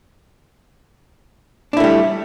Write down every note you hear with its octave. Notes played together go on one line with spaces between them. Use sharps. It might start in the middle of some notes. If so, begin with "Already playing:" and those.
G3 A3 D4 E4